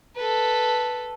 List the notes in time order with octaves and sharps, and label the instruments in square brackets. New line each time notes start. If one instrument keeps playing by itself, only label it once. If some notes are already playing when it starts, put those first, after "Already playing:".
[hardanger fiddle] A4 B4